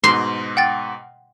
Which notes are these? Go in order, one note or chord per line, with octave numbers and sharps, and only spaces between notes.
G#2 B2 C6
F#5 G5 A6